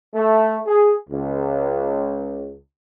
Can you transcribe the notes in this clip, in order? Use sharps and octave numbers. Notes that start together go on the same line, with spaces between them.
A3
G#4
C#2